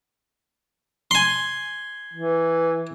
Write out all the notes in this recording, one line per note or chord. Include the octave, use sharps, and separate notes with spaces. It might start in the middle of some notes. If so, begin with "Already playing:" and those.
G#5 C6
E3